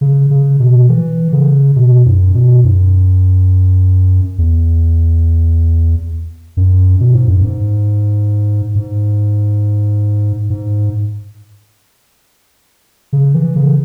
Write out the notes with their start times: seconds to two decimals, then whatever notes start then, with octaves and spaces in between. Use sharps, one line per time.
0.01 C#3
0.30 C#3
0.60 B2
0.89 E3
1.32 C#3
1.76 B2
2.06 F#2
2.34 B2
2.63 F#2
4.38 E2
6.57 F#2
7.00 B2
7.14 G#2
7.28 F#2
7.41 G#2
8.75 G#2
10.50 G#2
13.13 C#3
13.34 E3
13.56 C#3